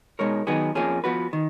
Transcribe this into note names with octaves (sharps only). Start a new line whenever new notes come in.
B2 G#3 D#4 A#4 C#5
D#3 F#3 B3 D#4 G#4
F2 F3 A#3 C#4 G#4
F3 B3 F#4 B4
D#3